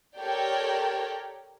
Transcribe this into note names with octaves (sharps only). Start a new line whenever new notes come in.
G4 A4 A#4 C#5 D5 G5